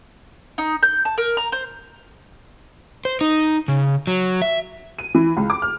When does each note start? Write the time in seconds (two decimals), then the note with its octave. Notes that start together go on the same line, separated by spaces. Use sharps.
0.58 D#4
0.83 G6
1.05 A5
1.18 A#4
1.37 A#5
1.52 C5
3.05 C5
3.21 D#4
3.68 C#3
4.07 F#3
4.42 E5
4.99 D#7
5.15 E3
5.37 C#2
5.50 D6
5.62 F6